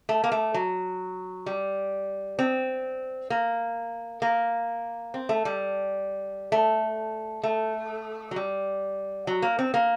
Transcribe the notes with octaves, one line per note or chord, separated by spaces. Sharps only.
A3
A#3
A3
F#3
G3
C4
A#3
A#3
C4
A3
G3
A3
A3
F#3
G3
F#3
A#3
C4
A#3